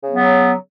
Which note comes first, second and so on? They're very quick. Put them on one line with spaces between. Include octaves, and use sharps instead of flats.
C#3 B3 F#3